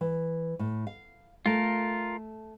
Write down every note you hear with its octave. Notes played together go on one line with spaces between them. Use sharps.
E3
A2
F5
A3 F4 A#4